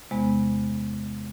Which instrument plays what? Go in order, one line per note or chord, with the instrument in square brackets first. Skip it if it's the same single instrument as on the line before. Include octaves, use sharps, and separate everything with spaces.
[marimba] E2 C3 G#3 B3